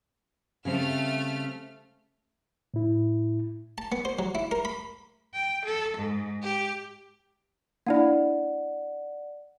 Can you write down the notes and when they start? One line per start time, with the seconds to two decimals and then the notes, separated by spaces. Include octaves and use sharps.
0.65 C#3 G3 A3 C4 F6
2.74 A2 E4
3.78 A5
3.92 B3
4.05 C5
4.19 F#3
4.35 E4
4.51 A#4
4.65 B5
5.33 G5
5.65 A4
5.97 G#2
6.43 G4
7.86 A#3 D4 E4 D5 F#5